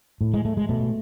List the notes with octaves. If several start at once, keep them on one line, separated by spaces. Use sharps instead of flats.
A2
G#3
A3
G#3
B2 A3